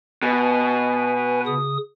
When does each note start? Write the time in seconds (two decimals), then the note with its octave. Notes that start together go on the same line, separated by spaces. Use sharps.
0.23 B2 B4 G#5
1.46 C#3 D#6